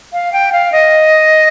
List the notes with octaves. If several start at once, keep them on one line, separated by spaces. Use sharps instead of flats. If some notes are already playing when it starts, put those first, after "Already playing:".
F5
G5
F5
D#5